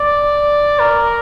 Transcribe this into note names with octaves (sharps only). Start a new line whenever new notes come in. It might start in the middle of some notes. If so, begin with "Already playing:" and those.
Already playing: D5
A#4